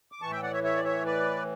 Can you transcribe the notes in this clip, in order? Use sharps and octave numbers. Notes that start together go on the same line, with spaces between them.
D6
A2 E3 A5 C#6
E5 G5
D5 F#5
C#5 E5
C#5 E5
D5
C#5 E5
B4 D5